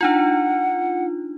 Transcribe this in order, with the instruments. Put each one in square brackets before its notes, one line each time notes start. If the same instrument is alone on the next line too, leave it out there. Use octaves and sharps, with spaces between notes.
[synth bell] D4 D#4 F4 [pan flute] F#5